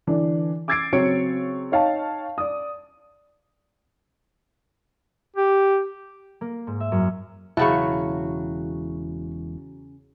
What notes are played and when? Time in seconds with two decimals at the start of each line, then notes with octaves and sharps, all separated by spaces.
0.07 D3 E3 D4
0.68 D6 E6 G#6 A6 C7 D7
0.93 C#3 F#3 C4 C#5 C#7 D7
1.72 D#4 C#5 F5 G5 A5
2.38 D5 D#6
5.36 G4
6.41 A#3
6.67 G#2
6.80 E5
6.92 F#2
7.57 E1 C#3 F#3 E4 F#4 A5 B5 C#6